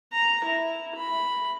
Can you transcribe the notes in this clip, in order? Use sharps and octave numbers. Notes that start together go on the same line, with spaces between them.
A#5
E4
B5